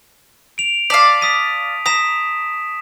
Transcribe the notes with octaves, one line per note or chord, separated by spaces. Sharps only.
D7 F7
D5 F5 A5 B6
D#6 B6 D#7
A#5 D#6 B6 E7